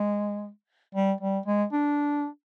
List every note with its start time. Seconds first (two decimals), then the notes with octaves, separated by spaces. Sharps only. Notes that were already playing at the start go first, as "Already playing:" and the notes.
Already playing: G#3
0.95 G3
1.21 G3
1.46 G#3
1.72 D4